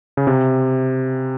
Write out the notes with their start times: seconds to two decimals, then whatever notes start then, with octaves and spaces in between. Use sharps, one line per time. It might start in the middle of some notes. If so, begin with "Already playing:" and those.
0.17 C#3
0.27 C3